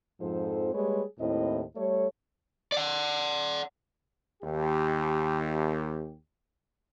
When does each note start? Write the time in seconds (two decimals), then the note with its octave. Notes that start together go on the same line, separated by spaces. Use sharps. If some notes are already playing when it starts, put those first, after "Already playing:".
0.20 F2 G#2 F3 C4 A4 C5
0.74 G3 G#3 A#3 G#4 B4 C#5
1.19 D#2 A2 C4 E4 C5 D#5
1.76 G3 A3 A4 C#5
2.72 D5 F#5
4.43 D#2 G4